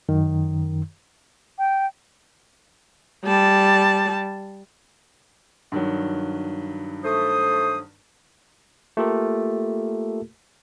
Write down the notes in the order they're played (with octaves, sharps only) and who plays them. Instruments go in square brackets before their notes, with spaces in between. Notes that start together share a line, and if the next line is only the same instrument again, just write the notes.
[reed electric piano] F#2 D#3
[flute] G5
[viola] G3 A5
[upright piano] G2 D#3 F#3
[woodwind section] A3 C5 D#6
[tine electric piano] A3 A#3 F4 G4 A4 A#4